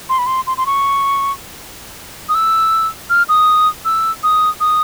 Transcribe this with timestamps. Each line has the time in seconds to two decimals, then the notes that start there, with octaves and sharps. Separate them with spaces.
0.09 C6
0.18 B5
0.27 C6
0.47 C6
0.57 C6
0.66 C#6
2.29 D#6
2.35 E6
3.10 F6
3.29 D#6
3.85 E6
4.23 D#6
4.60 D#6